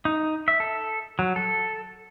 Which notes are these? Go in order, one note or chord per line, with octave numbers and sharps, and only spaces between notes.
D#4
E5
A4
F#3
A4